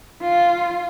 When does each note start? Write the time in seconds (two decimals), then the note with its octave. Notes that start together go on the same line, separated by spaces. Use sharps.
0.22 F4